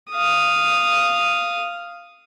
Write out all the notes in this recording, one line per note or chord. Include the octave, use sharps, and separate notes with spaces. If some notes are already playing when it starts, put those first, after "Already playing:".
F5 D#6